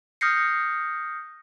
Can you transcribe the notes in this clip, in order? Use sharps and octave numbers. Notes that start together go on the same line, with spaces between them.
D#6 F6 G6 A#6 C7 C#7